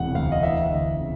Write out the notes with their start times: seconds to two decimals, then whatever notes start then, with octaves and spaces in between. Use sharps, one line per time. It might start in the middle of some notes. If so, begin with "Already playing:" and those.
Already playing: E1 C3 F#5
0.15 D2 F5
0.32 D#5
0.43 E3 E5
0.72 D2
1.00 C#3